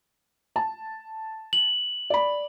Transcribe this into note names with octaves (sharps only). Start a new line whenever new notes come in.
A5
F#7
D5 B5